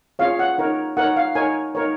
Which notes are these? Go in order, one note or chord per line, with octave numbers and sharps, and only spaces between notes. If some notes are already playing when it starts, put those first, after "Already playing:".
C#4 F4 G#4 C#5 F5
F#5
D#4 A#4 C#5
D#4 A#4 C#5 F#5
F5
D#4 A#4 C#5 G#5
D#4 A#4 C#5